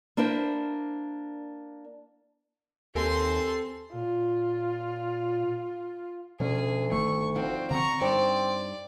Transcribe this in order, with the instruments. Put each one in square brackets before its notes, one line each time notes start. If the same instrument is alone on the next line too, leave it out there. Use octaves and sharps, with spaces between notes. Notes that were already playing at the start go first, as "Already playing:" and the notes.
[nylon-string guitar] A#3 D4 E4 A#4 C5
[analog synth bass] D#2 [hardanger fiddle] C4 C6 [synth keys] G4 A#4 G#5 [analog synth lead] A4
[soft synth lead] A#2 [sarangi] F4
[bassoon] D2 [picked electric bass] B2 F3 C#4 [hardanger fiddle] G#4
[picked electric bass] G1 D#3 A3 [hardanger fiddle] C#6
[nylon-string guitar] F3 D#4 F#4 [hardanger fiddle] C4
[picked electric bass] D3 C4 [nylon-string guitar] F#4 [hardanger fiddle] A#5 C#6
[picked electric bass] G2 [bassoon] C4 [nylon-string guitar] D#4 C5 [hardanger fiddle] D5